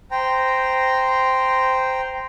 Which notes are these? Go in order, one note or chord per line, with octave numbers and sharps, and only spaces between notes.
C5 G5 A#5